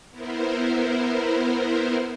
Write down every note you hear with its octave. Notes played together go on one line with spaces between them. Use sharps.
B3 E4 A#4 C5